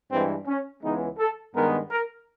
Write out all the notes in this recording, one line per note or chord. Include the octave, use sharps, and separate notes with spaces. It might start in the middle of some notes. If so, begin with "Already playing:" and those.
G2 E3 G#3 C4
C#4
C#2 C#3 E3 G#3 B3 D#4
A4
G2 D#3 G#3 B3 A#4
A#4